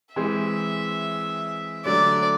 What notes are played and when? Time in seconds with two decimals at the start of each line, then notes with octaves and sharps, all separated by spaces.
0.15 E3 G#3 C4 E5
1.85 D3 F#3 A3 D5